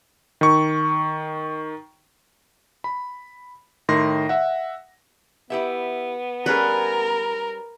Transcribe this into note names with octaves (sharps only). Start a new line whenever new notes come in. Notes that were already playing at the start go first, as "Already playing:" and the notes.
D#3 C#6
B5
A2 D#3 C6 A#6
E5 F#5
B3 E4 G4 E5
G3 C#4 G#4 A#4 B4